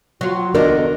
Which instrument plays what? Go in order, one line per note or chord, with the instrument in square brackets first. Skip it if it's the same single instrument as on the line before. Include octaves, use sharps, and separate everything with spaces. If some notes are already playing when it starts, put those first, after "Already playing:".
[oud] F#3 F4 [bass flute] F#4
[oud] E2 D3 D4 [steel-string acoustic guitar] A#4 D#5